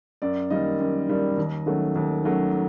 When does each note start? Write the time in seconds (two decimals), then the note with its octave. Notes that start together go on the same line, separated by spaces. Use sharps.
0.22 F#2 D5
0.50 D#3 G3 A#3 D#5
0.80 F#2
1.09 D#3 G3 A#3
1.37 D#2
1.66 D#3 F#3 A3 C#4
1.96 D#2
2.24 D#3 F#3 A3 C#4